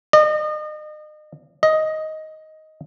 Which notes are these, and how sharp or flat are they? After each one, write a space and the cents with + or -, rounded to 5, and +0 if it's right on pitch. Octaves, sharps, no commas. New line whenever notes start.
D#5 -35
D#5 +10